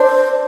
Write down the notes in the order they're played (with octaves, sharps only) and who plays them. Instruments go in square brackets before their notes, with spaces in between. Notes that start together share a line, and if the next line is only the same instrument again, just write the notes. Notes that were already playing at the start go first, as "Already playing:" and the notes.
Already playing: [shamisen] D4 [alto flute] C5